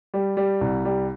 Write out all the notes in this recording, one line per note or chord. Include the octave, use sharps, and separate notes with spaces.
G3
G3
C2
G3